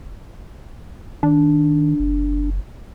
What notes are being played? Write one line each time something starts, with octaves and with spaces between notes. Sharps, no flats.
D#3 D4
F#1